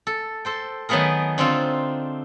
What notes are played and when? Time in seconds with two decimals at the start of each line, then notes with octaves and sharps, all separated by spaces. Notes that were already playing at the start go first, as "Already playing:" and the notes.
0.07 A4
0.45 A4 C5 G5
0.89 D#3 F#3 A3 B3 G#4 A#4
1.38 D3 C4 D4 D#4 F4